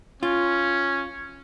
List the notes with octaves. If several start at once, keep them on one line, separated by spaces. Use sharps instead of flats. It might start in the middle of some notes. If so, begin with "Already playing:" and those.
C#4 F4